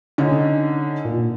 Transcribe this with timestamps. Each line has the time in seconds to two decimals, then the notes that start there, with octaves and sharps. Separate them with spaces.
0.18 D3 C#4 D#4
1.05 A#2